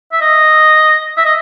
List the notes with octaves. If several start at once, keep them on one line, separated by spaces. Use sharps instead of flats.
E5
D#5
E5
D#5